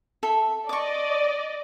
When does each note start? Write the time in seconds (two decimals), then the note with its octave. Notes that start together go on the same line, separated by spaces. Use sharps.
0.23 A4 E5
0.69 D5 D#5 C#6 D6